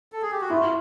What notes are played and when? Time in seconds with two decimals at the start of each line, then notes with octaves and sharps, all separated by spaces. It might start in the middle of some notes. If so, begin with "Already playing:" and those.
0.12 A4
0.22 G#4
0.32 G4
0.41 F#4
0.50 E4 F4